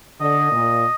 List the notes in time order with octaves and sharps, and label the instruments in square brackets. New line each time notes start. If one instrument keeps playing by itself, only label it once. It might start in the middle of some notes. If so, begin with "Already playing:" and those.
[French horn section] D3 [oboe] D#5
[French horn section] A#2